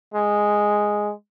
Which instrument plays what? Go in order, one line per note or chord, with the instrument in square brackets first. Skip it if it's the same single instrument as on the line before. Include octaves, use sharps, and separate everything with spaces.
[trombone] G#3